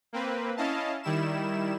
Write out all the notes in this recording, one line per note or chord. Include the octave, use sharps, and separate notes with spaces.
A#3 C4 B4
C#4 E4 D#5 F5 A5
D#3 G3 E4 E7